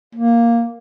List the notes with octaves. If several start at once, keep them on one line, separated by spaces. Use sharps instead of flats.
A#3